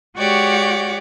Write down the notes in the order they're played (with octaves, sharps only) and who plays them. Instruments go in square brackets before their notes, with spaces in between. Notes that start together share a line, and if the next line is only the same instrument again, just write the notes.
[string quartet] G#3 F#4 G4 C#5 D5 F#5